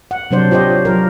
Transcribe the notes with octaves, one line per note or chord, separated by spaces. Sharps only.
F#5
C3 F#3 D4 C5 D5
F4 G4 C5 C#5 D#5
F#3 F4 A#4